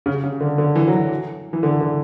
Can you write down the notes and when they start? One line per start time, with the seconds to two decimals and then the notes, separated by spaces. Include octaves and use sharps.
0.06 C#3
0.24 C#3
0.40 D3
0.58 D3
0.76 E3
0.87 F#3
0.93 E3
1.53 E3
1.63 D3
1.80 D3